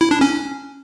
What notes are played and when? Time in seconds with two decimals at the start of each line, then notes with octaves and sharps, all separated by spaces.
0.01 E4
0.11 D4
0.21 C#4